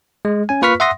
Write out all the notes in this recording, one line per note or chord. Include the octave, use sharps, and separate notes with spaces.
G#3
C#4 G#5
A#3 F4 B4 C#6 F6 B6
E5 F#5 C6 D#6 A#6